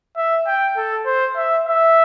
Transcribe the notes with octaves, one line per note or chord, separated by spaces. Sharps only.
E5
G5
A4
C5
E5
E5